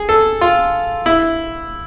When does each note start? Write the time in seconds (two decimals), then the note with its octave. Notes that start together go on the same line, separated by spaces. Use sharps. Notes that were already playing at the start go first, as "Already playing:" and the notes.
Already playing: G#4
0.09 A4
0.41 F4
1.06 E4